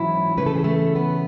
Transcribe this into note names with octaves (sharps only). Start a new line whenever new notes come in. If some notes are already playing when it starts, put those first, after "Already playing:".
Already playing: G#2 E3 F#3 C#4 E4
C#3 E3 A3 C#4 B4
A4
G#4
A3 A4
B3 B4